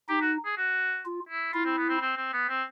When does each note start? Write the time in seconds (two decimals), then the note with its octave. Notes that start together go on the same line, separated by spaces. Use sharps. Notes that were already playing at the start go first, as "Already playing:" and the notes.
0.09 D#4 G4
0.21 F#4
0.45 G#4
0.57 F#4
1.06 F4
1.29 E4
1.53 E4 F4
1.65 C4
1.78 B3
1.89 C4
2.02 C4
2.17 C4
2.33 B3
2.49 C4